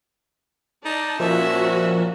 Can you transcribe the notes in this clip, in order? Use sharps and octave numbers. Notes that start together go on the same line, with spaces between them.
D#4 D5 A5
A#2 F3 C#4 F#4 E5